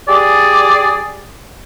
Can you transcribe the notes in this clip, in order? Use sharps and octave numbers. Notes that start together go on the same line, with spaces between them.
G4 G#4 D5